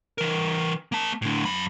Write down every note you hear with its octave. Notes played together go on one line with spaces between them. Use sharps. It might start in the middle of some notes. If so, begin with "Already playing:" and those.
E3 A#4
A#3 A5
A2 D3
F#2 B5